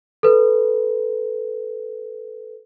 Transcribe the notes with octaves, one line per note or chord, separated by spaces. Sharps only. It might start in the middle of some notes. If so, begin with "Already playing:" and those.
A4 B4